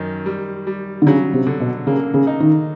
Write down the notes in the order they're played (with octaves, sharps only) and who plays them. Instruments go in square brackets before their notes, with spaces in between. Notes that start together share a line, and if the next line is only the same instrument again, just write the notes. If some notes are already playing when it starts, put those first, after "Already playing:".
Already playing: [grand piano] F#2 D#3
G3
G3
[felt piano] D3
[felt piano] C#3 [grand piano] F#3
[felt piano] C3
[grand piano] D3
[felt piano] B2
[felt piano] C#3 [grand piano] A#3
[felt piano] C#3
[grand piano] D#4
[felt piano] D#3